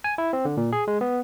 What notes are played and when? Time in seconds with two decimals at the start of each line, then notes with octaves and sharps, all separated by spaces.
0.04 G#5
0.18 E4
0.33 C4
0.45 D3
0.57 A#2
0.73 G#4
0.88 G#3
1.01 B3